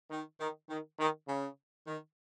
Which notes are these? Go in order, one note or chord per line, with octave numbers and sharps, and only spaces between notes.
D#3
D#3
D#3
D#3
C#3
D#3